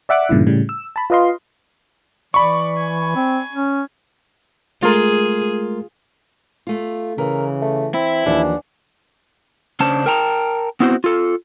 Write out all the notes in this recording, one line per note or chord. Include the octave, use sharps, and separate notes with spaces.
D5 E5 F#5 D6 F#6
G2 A#2 C#3 E3 E4
A2 C#3 G3
E6
A5 B5
F4 B4 D#5 F5 C6
E3 D5 B5 C#6
G#5
C4
C#4
G#3 A3 F4 G#4 A#4
A3 F4
C#3 E3 A#4
A3
C4 E4
D#2 E3 F3 D4 F#5
C#3 C#4 D4 C5 A5
A#4 G5 A5 A#5
B3 C4 E4 F#4 C5
F4 A4